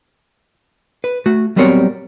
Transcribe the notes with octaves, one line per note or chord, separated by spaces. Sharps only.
B4
A3 F#4
F#3 G3 B3 C4 A#4 C#5